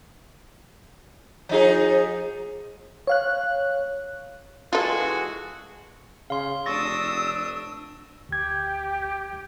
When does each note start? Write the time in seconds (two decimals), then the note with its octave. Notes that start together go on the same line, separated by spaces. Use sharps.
1.49 F3 D#4 G#4
3.07 C#5 F5 F#6
4.73 E3 G#3 F4 F#4 A4
6.30 C#3 F5 C6
6.66 F1 D4 C#6 D#6 E6 A6 A#6
8.29 D2 G4 G#6